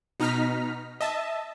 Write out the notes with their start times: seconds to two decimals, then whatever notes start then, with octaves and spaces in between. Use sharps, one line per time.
0.20 B2 D#4 A#5 F6 B6
1.01 D#5 E5 A5